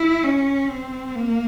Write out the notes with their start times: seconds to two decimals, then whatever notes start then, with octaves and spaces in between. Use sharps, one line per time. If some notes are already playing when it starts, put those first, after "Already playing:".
Already playing: E4
0.23 C#4
0.69 C4
1.16 A#3